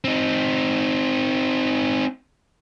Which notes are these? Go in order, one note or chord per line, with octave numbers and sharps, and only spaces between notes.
C4 D#4